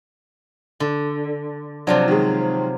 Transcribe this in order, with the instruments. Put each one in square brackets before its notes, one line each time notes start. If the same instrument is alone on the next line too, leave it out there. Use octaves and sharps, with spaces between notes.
[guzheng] D3
[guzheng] C3 F3 F#3 [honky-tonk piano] D4
[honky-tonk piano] D#3 G#3